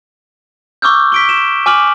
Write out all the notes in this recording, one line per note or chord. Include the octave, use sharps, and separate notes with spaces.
C#6 D6 E6 F6 G6
B6 D7 G7
E7
G#5 D6 F6 F#7